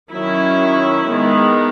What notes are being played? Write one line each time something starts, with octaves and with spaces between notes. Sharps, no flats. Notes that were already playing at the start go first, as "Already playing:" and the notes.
D#3 F#3 C#4 E4
D#3 G#3 B3